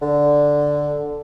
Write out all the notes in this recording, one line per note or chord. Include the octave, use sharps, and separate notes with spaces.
D3